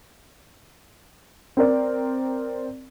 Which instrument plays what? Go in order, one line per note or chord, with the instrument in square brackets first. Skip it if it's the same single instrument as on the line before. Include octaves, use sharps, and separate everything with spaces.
[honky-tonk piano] C4 A#4 D5